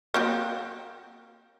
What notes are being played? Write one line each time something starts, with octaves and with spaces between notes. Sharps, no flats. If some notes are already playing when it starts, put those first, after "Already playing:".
A#3 C4 F#4